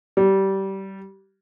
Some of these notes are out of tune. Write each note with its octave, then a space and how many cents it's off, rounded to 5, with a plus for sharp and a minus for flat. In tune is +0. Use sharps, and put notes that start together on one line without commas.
G3 -20